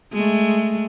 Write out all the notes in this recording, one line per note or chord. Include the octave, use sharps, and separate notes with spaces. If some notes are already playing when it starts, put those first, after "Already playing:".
G#3 A3